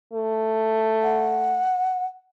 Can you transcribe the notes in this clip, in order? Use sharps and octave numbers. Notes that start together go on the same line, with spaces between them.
A3
F#5